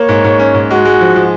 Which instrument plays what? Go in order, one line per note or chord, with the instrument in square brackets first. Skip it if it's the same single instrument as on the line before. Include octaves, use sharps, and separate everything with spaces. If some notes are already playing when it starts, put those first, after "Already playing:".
Already playing: [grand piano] A#3 [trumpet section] C#5
[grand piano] G#2
G#2
C#4
G#2
[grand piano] G#3 [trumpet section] F#4
[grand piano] G#3
F3
F3